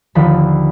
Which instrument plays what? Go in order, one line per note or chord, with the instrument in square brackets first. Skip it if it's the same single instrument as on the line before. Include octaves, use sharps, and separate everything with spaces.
[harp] D#2 D3 F3 B5